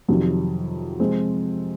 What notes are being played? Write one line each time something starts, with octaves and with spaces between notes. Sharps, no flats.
F2 C3 D#3 F#3
C3 F3 G#3 C4